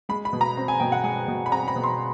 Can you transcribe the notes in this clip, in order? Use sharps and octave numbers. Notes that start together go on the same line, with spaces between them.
G#3 B5
B5
B2
A#5
C4
G#5
B2 G5
F#5
G#3 G#5
B2
B5
C4 A#5
B5
B2
C6